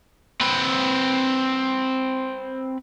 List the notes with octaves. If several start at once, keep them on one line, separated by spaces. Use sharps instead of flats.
C4 B4